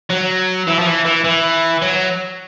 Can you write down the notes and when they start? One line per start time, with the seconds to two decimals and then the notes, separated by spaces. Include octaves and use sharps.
0.10 F#3
0.67 E3
0.79 F3
0.86 E3
1.05 E3
1.24 E3
1.82 F#3